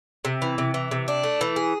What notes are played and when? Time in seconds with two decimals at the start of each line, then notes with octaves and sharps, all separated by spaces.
0.25 C3
0.42 E3
0.58 C3
0.74 E3
0.91 C3
1.08 D4
1.24 A3
1.41 E3
1.56 G#4